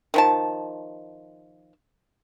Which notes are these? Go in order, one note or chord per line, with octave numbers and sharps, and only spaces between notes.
D#3 F3 A5